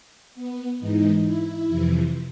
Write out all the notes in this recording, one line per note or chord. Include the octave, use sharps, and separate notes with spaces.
B3
G#2 E3 D#4
E4
F2 C3 E3